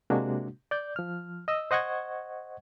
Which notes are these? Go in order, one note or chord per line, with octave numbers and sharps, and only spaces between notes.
C3 G#3 A#3 D4 F#4
D5 G6
F3 F6
D#5 E6
C5 D#5 F#5 C#6 G#6